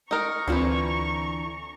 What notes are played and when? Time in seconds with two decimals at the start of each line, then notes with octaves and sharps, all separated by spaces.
0.11 D#4 A#4 A#5 C#6
0.48 D2 D3 E3 C4 F4 B4 C5